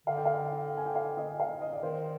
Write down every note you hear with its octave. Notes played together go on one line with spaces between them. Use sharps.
D3 F5
G5
F5
G5
G#5
G5
F5
D#5
F5
D#5
D5
D#3 C5